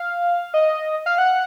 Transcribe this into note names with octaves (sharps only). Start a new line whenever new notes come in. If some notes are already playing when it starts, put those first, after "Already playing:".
Already playing: F5
D#5
F5
F#5